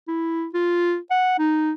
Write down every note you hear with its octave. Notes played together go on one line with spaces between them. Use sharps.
E4
F4
F#5
D#4